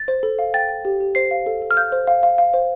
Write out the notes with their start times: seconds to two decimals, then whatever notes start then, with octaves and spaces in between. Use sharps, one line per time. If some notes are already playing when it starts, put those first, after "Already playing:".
Already playing: A6
0.08 C5
0.23 A4
0.39 F5
0.54 G5 A6
0.69 G5
0.85 G4
1.00 G4
1.15 C5 C7
1.31 F5
1.46 A4
1.62 A4
1.71 F6
1.77 F5 G6
1.92 C5
2.07 F5
2.23 F5
2.38 F5
2.54 C5